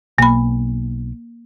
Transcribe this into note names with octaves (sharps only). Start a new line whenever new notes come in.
B1 A#3 B5